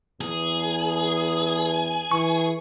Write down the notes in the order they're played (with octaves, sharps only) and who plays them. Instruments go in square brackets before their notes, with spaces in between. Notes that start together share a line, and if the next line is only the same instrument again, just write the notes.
[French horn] E2 [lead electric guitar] G#4
[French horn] E3 [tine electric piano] C#6